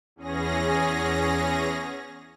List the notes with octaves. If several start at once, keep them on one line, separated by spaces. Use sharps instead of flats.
E2 C#4 G#4 A#6